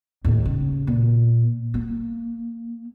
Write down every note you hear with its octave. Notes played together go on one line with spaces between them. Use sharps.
D#2 A2
C#3
A#2
A#3